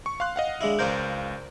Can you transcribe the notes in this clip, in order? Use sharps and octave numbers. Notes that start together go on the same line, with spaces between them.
C#6
F5 C6 F#6
D#5 F5 F#5
G#3 D4 E4
C#2 A#4 C5 D5 F5 G6